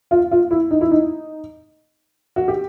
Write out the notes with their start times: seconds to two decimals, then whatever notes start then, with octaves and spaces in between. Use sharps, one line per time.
0.11 F4
0.31 F4
0.51 E4
0.71 D#4
0.81 E4
0.91 D#4
2.36 F#4
2.48 G4